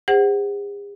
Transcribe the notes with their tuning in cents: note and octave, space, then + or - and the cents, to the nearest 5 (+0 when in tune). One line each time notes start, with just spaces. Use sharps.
G#4 -45 C5 +0 F#5 +15